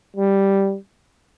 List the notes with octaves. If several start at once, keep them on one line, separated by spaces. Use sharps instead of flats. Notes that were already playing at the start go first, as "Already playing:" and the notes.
G3